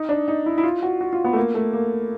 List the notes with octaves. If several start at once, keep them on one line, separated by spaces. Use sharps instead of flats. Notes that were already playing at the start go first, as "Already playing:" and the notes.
Already playing: D#4
D4
D#4
E4
E4
F4
F#4
F#4
F4
B3
A3
A#3
A3
A#3